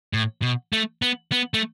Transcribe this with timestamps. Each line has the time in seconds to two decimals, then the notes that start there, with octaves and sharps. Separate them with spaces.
0.13 A2
0.42 B2
0.73 A3
1.02 B3
1.32 B3
1.54 A3